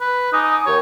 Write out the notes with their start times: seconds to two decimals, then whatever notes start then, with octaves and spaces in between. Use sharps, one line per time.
0.01 B4
0.33 D#4 G#5 D6 D#6
0.66 D#2 C#5